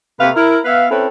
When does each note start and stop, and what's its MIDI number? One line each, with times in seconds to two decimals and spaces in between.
0.21 0.30 48
0.21 0.30 57
0.21 0.30 58
0.21 0.30 71
0.21 0.30 77
0.35 0.59 64
0.35 0.59 70
0.65 0.86 59
0.65 0.86 71
0.65 0.86 76
0.65 0.86 77
0.91 1.07 60
0.91 1.07 61
0.91 1.07 64
0.91 1.07 69
0.91 1.07 71